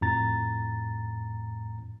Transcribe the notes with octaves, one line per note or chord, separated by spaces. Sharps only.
F2 A2 A#5 A6